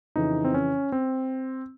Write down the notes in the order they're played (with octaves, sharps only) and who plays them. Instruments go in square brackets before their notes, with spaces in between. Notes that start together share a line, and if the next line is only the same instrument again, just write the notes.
[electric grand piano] F2 C#3 E3 D#4
C4
C#4
C4